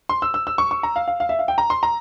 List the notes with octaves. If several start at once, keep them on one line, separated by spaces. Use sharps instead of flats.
C6
E6
E6
E6
C#6
C#6
A#5
F5
F5
F5
E5
F5
G5
A#5
C6
A#5